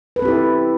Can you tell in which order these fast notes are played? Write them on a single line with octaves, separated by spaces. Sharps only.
B4 A4 C4 G4 E4